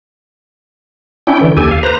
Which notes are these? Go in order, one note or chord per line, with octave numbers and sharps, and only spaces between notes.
C#4 D4 E4 G5
D3 E3
D#2 G4 A4 G#5
F5
B4 C5 A#5